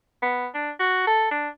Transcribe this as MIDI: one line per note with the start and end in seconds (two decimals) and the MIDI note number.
0.22 0.47 59
0.54 0.70 62
0.79 1.05 66
1.07 1.27 69
1.31 1.48 62